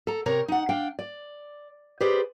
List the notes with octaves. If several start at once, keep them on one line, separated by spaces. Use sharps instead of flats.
A4 A#5
C3 C4 A#4 C#5 A#5
D#4 F#5
D4 F5 G5
D5
G4 G#4 B4 C5 D5